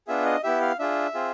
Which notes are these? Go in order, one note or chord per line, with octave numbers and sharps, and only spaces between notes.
B3 D4 F4 G#4 E5
D#5
B3 E4 G4 E5
F5
D4 F4 G#4 E5
C4 F4 G#4